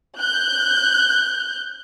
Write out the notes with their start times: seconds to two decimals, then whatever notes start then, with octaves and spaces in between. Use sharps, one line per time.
0.19 F#6 G6